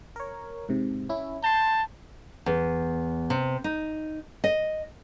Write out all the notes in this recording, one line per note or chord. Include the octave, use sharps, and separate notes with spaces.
A#4 C#5
G#2 C3
C#4 E4
A5 C6 G6
E2
C3
D#4
D#5